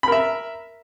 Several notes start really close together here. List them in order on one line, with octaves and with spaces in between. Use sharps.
B5 A#4 E5